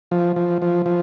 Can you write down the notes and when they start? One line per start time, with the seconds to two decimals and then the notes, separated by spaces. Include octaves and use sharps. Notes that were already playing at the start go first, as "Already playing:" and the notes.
0.11 F3
0.36 F3
0.62 F3
0.86 F3